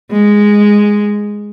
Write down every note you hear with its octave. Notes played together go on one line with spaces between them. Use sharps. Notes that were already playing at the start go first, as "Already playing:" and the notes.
G#3